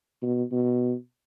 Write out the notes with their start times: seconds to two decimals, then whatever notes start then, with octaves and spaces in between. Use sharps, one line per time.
0.22 B2
0.52 B2